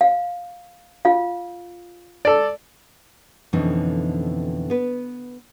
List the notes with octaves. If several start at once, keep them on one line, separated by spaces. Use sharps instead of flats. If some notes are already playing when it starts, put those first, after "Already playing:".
F5
F4 F5
A4 D5
F2 B2 D3 E3 C#4 D#4
B3 B4